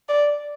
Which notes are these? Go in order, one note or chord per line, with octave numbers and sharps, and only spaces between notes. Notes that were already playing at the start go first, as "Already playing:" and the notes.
D5